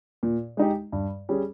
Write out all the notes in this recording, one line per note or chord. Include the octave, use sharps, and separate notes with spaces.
A#2
G#3 D#4 G4
G2
G3 C#4 G#4